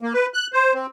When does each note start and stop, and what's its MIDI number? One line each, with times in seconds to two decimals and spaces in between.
0.01 0.13 58
0.14 0.26 71
0.34 0.47 90
0.53 0.73 72
0.74 0.86 60